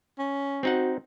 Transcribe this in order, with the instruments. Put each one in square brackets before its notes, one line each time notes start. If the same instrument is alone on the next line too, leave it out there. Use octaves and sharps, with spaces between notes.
[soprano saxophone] C#4
[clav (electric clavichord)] C4 D#4 F#5 [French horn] F#4